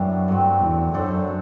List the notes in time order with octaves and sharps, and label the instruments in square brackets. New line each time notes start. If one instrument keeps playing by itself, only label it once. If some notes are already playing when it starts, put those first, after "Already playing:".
Already playing: [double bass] F#2 [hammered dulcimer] E3 G3 B3 D4
[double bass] G2 [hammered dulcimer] F#3 A3 C4
[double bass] E2
[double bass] F#2 [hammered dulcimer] A3 D4 A4 C5